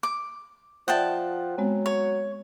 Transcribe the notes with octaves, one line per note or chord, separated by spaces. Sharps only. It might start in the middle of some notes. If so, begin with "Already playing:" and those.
D6
F3 D5 E5 F#5 G5 A5 D#6
F#3 G#3 B3 C4
C#5